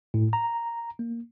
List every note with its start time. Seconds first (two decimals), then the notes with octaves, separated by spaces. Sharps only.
0.14 A2
0.33 A#5
0.99 A#3